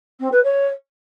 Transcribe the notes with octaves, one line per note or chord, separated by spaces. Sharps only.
C4
B4
C#5